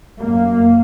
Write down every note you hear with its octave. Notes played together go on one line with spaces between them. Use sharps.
F#2 A#3